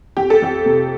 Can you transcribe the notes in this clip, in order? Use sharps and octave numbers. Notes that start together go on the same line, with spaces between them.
F2 G4
A4
F2 G4
C3